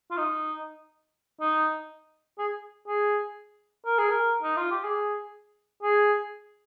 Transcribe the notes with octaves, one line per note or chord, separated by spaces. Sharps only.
F4
D#4
D#4
G#4
G#4
A#4
G#4
A#4
D#4
F4
G4
G#4
G#4